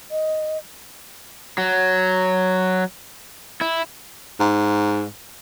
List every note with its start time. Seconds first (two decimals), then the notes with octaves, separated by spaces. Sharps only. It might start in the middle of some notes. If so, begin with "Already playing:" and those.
0.11 D#5
1.58 F#3
3.61 E4
4.40 G#2